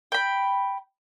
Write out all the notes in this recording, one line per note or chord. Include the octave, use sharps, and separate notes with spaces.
G5 B5